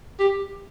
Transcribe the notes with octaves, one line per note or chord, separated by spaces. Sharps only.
G4